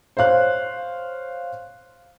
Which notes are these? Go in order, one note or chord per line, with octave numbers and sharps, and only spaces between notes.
C5 C#5 F5 F#6